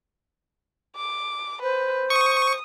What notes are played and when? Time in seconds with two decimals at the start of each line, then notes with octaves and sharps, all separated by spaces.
0.96 D6
1.62 B4 C5
2.10 C#6 D#6